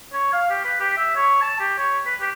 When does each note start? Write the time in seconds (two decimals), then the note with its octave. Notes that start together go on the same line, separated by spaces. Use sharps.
0.13 C#5
0.33 F5
0.50 G4
0.64 B4
0.80 G4
0.97 E5
1.16 C#5
1.42 A5
1.60 G4
1.78 C#5
2.06 B4
2.21 G4